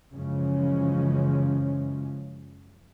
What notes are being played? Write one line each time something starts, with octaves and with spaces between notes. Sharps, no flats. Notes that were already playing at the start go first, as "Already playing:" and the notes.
F#2 C#3 E3 F3 G#3 C#4